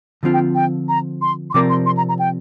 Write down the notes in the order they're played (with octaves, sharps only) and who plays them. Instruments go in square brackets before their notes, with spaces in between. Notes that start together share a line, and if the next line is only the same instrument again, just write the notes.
[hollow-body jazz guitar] D3 F3 C4 F4
[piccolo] G5
G5
A#5
C6
C6
[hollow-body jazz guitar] C3 F3 C4 A#4 D5 [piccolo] D6
[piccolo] C6
C6
A#5
A#5
G5